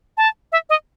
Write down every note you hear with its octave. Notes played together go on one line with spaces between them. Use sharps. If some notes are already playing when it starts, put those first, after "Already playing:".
A5
E5
D#5